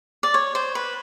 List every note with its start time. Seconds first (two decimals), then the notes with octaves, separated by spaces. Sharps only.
0.23 D5
0.34 C#5
0.55 C5
0.75 B4